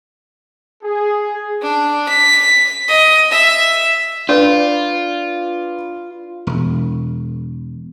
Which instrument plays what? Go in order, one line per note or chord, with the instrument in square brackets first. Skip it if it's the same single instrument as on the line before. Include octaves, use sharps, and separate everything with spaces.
[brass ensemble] G#4
[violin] D4
B6
D#5
E5
[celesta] D4 [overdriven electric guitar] F4 [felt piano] B4 D5
[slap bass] E1